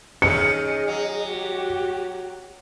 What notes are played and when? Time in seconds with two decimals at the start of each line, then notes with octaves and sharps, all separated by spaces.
0.22 D#3 C#4 G#4 D#5 C#7
0.88 F#3
1.28 F#4 G4